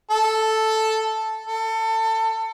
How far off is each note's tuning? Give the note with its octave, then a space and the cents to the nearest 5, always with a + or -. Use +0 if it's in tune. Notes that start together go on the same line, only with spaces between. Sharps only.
A4 +0
A4 +25